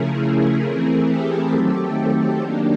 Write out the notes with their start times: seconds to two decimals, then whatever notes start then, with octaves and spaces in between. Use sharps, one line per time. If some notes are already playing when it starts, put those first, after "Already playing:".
Already playing: C#3 F3 A3 C#4 E4 G#4 A#4
0.64 E3 A3 C4 E4
1.08 G4 A4
1.53 D#3 F#3 A3 C4
1.97 G4
2.41 D#3 F#3 A#3 D4